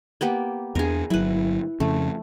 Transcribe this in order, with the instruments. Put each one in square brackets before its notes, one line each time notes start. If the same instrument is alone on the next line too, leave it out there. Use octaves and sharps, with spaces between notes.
[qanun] A#3 B3 G4
[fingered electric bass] E2 A3 D4 [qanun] G#4 A#4
[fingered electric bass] G1 F#3 [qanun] E4 B4
[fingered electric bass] F2 C#3 [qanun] A3